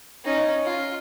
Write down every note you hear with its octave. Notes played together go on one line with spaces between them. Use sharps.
C#4 D#4
F4